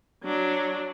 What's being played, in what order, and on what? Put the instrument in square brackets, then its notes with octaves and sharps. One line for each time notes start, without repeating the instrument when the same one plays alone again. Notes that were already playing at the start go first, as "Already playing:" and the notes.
[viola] F#3 D4